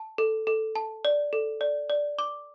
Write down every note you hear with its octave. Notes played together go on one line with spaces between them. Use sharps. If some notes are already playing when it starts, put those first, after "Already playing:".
Already playing: A5
A4
A4
A5
D5
A4
D5
D5
D6